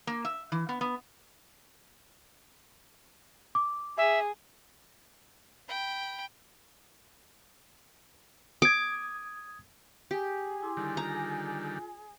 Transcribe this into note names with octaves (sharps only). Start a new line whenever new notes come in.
A#3
E5
E3
B3
B3
D6
G#4 E5
G5 B5
D6 D#6 G#6
G4 G#4
E4 C6 D6
D3 D#3 G3
F4 G#5 A#5